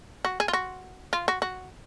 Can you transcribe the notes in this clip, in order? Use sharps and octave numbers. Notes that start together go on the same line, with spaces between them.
F#4
G#4
F4
F#4
F4
F#4
F#4